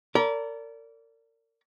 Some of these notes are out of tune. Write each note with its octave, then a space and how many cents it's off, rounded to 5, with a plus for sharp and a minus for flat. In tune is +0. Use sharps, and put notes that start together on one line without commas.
A#4 -35 D5 -30 B5 -45